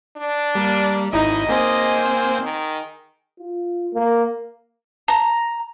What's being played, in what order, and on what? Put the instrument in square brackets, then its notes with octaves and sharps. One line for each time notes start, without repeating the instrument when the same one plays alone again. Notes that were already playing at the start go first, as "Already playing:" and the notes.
[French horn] D4
[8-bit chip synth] G3 [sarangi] A#3
[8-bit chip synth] G#1 E4 [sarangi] D#4 [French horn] D#5
[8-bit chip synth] A#3 C4 C5 [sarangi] G#4
[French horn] D#3
[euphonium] F4
A#3
[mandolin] A#5